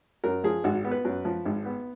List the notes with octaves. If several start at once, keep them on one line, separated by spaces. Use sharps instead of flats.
F#2 A#4
F3 G#4
G#1 F#4
B3
B4
F#2
F3
G#1
B3